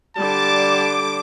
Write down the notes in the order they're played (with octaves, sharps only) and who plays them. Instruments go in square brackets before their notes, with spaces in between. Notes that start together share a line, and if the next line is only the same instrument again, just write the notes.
[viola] D3 G3 [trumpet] A5 [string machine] D6